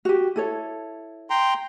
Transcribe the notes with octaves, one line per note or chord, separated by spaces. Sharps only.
F#4 G4
E4 A4 C#5
G5 A#5 C6